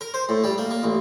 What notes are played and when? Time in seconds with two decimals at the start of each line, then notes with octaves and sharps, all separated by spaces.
0.01 A#4
0.14 C5
0.29 A2
0.44 G3
0.58 A#3
0.71 A#3
0.83 A1